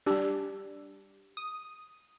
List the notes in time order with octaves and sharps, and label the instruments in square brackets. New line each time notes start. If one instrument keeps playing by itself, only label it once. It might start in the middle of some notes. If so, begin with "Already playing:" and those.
[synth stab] G3 D4 [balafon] G4
[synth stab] D#6